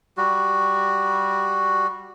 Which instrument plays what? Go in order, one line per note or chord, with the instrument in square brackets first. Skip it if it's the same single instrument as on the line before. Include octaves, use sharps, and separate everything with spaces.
[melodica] G3 F#4